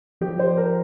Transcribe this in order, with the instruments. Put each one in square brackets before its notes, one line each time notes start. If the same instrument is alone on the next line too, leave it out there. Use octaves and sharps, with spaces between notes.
[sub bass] F3 [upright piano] G4
[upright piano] C5
A#4